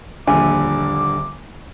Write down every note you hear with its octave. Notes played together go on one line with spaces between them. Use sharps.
D#1 A#1 D3 G#5 D6